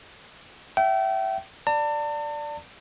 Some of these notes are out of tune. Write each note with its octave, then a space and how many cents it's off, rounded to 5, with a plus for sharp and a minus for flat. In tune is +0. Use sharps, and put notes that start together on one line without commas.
E5 +15 G5 -35
D5 +0 A5 +40